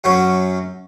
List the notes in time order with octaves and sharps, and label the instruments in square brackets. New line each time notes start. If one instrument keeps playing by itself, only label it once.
[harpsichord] F#2 F#3 C#4 F#4